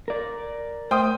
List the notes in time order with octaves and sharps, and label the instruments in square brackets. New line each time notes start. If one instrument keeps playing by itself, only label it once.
[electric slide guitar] A#4 D5
[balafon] A3 [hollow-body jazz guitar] C5 [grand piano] G5 D#6